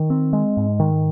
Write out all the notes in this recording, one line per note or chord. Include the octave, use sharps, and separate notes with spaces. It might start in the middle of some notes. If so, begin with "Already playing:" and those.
Already playing: D#3
C4
G#3
G#2
D#3